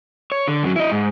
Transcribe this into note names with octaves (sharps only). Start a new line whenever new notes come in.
C#5
D3
F#2 F#3
E4 D#5
G#2